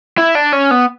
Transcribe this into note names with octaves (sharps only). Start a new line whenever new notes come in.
E4
D4
C#4
B3